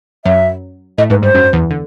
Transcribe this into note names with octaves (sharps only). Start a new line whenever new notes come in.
F#2 F#3 E5
A2 A3 D#5
G#2 G#3 B4
G2 G3 C5
F#2 F#3
E2 E3
D3